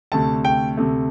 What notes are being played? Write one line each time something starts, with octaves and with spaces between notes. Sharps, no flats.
D2 C3 A3 A5
G5
D2 C3 A3